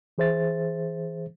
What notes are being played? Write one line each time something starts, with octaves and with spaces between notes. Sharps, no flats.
E3 G#4 C5 E5 A6